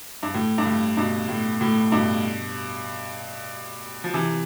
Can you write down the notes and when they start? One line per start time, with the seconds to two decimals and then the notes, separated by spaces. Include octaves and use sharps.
0.23 G2
0.34 A2
0.58 G2
0.66 A2
0.97 G2 B2
1.29 A2
1.61 A2
1.92 G2 B2
4.04 F3
4.14 C3 E3